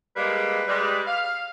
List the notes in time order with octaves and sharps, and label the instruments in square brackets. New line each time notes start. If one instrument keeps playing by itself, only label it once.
[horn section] G3 G#3 A#3 [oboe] B4
[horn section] G3 G#3
F5